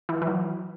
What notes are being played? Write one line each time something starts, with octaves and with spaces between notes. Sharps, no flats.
E3
E3
F#3